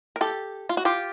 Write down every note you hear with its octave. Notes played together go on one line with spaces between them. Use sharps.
A#4
G4 A4
F4
F#4
F4 G4